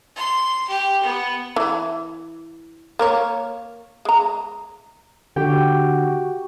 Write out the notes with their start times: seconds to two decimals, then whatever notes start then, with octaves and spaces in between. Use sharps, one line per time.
0.16 C6
0.69 G4
1.03 B3
1.56 E3
2.99 A#3 A#4 C#5
4.05 G#3 A#5
5.36 D3 F#4 G4 G5